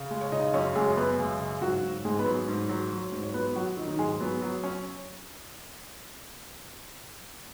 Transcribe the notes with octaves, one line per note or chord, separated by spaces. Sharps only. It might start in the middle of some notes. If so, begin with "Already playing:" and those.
Already playing: C#3
G#3
C#5
C#3 D#4 D#5
F#2 C#4 C#5
F#2 G#3 G#4
F#2 B3 B4
C#3 G#3 G#4
C#3
G#2 F#3 F#4
G#2
G#2 G#3 G#4
B3 B4
F#3
G#2
F#3
F#3
G#2
C#5
F#3 B3 B4
F#3 F#4
D#3 F#3 D#4
D#3 D#4
G#2 G#3 G#4
F#3 B3
F#3
C#4